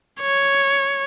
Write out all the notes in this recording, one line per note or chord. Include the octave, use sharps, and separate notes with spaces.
C#5